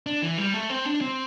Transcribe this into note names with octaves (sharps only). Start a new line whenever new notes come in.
D4
E3
G3
A3
C4
D4
C4